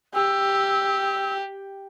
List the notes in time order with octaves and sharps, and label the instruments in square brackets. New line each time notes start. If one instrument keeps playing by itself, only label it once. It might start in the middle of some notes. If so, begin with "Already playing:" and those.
[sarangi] G4 [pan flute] E6